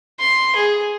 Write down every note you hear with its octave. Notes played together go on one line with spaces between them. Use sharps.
C6
G#4